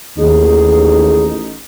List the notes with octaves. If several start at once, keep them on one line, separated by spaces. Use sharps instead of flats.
A1 D#2 D#4 G#4